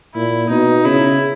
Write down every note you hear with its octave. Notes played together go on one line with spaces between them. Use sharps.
A#2 E4
B2 D#4
C#3 E4